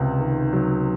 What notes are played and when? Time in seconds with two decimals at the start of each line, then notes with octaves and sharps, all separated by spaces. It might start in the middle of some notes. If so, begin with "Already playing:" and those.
Already playing: C#2 C3
0.20 D#3
0.53 F#3